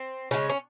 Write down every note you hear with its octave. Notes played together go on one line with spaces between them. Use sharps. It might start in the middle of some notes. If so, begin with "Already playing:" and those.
Already playing: C4
C#3 F3 G#3 C#4
C#4